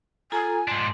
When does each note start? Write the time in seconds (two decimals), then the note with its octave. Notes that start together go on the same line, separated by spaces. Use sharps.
0.32 F4 A4 G#5 A#5
0.68 G#2 D4 C6